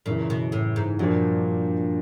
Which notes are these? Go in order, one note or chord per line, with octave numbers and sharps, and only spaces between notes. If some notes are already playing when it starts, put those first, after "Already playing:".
F#2 A#2 C#3 E3
B2
A2
G#2
G2 A#2 F3 A#3 D4 F#4